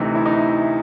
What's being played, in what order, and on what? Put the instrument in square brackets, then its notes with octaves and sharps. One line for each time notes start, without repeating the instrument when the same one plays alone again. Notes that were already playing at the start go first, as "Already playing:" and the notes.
Already playing: [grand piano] D2 C3 E3 D#4
E4
D#4